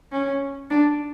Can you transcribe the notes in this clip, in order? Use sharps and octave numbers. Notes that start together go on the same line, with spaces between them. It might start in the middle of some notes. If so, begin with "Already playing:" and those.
C#4
D4